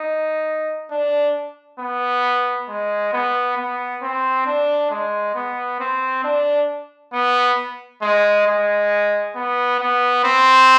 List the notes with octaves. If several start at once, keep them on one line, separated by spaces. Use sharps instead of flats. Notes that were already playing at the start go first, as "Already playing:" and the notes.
Already playing: D#4
D4
B3
G#3
B3
B3
C4
D4
G#3
B3
C4
D4
B3
G#3
G#3
B3
B3
C4